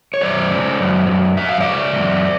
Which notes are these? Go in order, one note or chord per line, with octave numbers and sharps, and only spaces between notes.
C#5
F#2 C5 D5
C#3
F#2
F#2
F#2 E5
F5
D5 E5
C#3
F#2